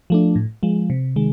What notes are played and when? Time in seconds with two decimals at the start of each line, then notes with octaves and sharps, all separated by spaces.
0.10 F3 A3 D4
0.36 A2
0.63 F3 G#3
0.90 C3
1.16 D#3 G#3